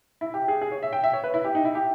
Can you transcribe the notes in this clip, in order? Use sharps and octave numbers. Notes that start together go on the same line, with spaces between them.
E4
G4
G#4
G#4
C#5
E5
G5
E5
C#5
B4
E4
G4
D#4
E4
G4